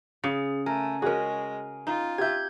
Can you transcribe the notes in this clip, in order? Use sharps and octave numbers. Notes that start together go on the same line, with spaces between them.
C#3 G#4
A3 A#4 G#5
G#3 C#4 F#4 G#4 A#4
D#4 F4
G4 E5 G6 G#6